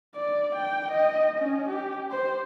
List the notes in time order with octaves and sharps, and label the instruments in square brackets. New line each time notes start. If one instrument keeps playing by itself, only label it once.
[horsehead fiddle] D5
G5
D#5
C#4
G4
C5